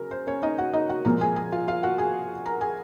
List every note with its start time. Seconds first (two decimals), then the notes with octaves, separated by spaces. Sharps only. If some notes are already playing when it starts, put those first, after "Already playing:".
Already playing: C#3 F#3 A#4
0.11 C5
0.27 C#4 C#5
0.42 D#4 D#5
0.58 F#4 F#5
0.74 D#4 D#5
0.89 F#4 F#5
1.05 A#2 F3 G#3 C4 A#4 A#5
1.21 G#4 G#5
1.36 G#4 G#5
1.52 F4 F5
1.68 F4 F5
1.83 F#4 F#5
1.98 G#4 G#5
2.46 A#4 A#5
2.61 G#4 G#5